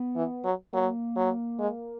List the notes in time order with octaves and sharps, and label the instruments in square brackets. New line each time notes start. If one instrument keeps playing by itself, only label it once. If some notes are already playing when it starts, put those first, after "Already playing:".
Already playing: [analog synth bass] B3
[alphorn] E3
F#3
[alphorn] F#3 [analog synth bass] A#3
[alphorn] F#3
G#3